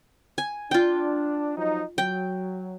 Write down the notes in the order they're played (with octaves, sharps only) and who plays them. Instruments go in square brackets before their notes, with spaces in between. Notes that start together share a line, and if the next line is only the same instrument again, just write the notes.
[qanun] G#5
[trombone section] D4 [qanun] F4 G5
[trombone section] F3 F#3 D#4
[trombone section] F#3 [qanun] G5